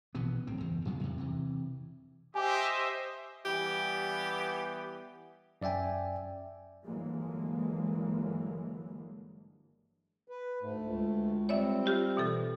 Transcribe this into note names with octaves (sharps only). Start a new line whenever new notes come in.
A#1 B2 E3 B3
D1 G1 C4
F#1 E2
F2 C#3 F3 G#3
E2 C3
C3 E3
G4 C5 D#5 E5 G#5 D6
E3 G3 B3 G4
F#2 D5 E5 G5 G#5
G1 D3 E3 F#3 G#3 A#3
B4
D2 G#2 A3
C#2
G3 C4 C#5 D5 E5
F4 G4 F6
B2 E3 A4